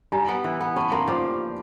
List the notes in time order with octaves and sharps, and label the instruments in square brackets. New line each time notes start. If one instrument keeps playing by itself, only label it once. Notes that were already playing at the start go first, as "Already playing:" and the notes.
[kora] G3 [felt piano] G#5 A#5
[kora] B3
E3
B3
[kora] C#4 [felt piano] A5 B5
[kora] A#3 [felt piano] A#5 C6
[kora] F3 [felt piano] C6 D6